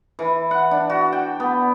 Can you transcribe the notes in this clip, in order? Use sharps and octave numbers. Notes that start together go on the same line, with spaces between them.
E3
F#5
D4
F#4
G5
B3